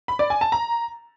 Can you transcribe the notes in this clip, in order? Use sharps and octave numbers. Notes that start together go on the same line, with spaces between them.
B5
D5
G#5
A5
A#5